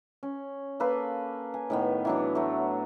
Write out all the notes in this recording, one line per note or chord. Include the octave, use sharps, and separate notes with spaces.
C#4
A#3 A4 B4 F5
G#5
A2 D#3 B3
E3 F#3 D4
F#3 A3